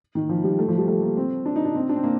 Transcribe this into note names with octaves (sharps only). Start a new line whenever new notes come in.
D#3
F3
G3
A3
F3
G3
A3
A#3
C4
D4
D#4
D4
C4
D4
C4
A#3